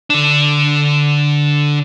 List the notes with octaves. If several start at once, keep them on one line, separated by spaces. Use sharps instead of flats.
D3 D4